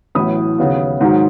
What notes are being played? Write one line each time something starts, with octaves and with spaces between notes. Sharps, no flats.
A1 A2 F#3 B3 B5 D#6
D#2 C#3 F#3 B3
G#2 D#3 F#3